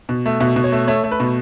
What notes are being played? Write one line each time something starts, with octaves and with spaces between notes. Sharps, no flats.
B2
A3
B2 E5
B2
C#5
A3
A3 C#5
A3
B4
B2